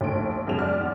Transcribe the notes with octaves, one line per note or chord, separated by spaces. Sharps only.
A#1 D#2 A3 D7
F#2 B2 G#3 F7
D5 D6 F6
E2